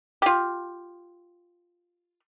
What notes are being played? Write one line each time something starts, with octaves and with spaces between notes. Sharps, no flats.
F4 G4